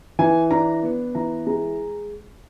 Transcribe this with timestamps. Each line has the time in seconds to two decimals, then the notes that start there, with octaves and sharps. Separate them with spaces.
0.19 E3 G#5
0.51 D4 A#5
0.83 B3
1.15 E3 A#5
1.47 G#3 A#5